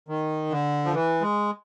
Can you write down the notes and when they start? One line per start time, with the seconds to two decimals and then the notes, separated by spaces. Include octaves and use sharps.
0.08 D#3
0.51 D3
0.85 F3
0.93 E3
1.21 G#3